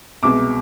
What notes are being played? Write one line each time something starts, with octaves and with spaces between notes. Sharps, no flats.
C2 B2 G#3 D6